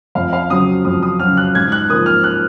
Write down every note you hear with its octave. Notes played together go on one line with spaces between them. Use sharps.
F2 F5
F5
C#3 F#3 D#6
F2 D#6
D#6
C#3 F#3 F6
F#6
G#2 G#6
F#6
F3 A#3 D#6
F6
F#6